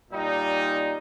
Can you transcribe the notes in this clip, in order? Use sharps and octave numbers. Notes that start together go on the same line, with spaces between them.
A#2 G3 D#4